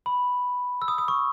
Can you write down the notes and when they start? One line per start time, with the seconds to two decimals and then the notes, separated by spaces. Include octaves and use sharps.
0.06 B5
0.82 E6
0.88 D#6
0.98 D#6
1.08 C#6